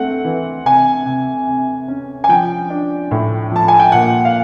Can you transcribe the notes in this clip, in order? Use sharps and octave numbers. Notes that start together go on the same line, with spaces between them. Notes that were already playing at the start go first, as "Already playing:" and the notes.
Already playing: A3 C4 F#5
E3
C3 G#5
C3
C3
C#4
G#5
F3 G5
D4
A2
F3 A5
G#5
G5
A#2 F#5
F5